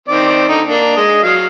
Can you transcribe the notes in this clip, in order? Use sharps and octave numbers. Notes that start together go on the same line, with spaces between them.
D#3 C4 D5
D3 D#4
A#3 D4
G#3 D#5
F#3 F5